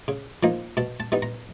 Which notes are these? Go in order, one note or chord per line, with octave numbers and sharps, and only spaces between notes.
C#3
F3 A#3 D#4
B2 A5
A5
G3 B3 D#4
A#5